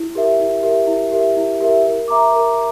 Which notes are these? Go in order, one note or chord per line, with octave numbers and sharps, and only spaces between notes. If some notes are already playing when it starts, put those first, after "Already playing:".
Already playing: E4
G4 A#4 E5
E4
G4 A#4 E5
E4
G4 A#4 E5
E4
G4 A#4 E5
A#4
E5 A#5 D6
A#4